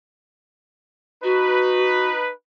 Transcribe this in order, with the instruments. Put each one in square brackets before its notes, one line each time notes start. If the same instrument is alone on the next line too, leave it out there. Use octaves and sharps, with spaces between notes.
[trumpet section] D#4 B4 [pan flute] F#4